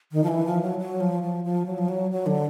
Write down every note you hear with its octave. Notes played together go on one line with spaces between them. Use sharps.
D#3
F3
E3
F3
F#3
F#3
F3
F3
F3
F#3
F3
F#3
F#3
D3